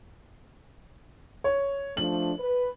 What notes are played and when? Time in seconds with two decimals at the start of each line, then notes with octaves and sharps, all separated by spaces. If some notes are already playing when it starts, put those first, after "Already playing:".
1.44 C#5
1.97 F3 A3 D4 F#7
2.38 B4